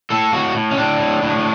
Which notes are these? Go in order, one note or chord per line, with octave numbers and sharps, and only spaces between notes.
A2 A4
A2 F#4
A2
C#4
A2 D4
A2
A2